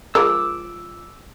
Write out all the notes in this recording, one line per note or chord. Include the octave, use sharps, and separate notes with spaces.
F3 G#3 A#4 D6 E6